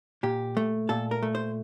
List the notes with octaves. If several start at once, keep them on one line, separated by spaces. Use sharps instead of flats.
A#2 G4
A3
A#2 A4
A#4
A3
C5